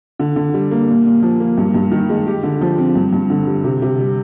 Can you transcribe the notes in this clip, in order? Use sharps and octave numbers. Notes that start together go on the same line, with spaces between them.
D3
D3
G3
A#3
A#2
A#2
F3
A#3
G2
G2
D#3
G#3
G4
D3
F3
C4
G2
G2
D3
G3
C3
C3
G3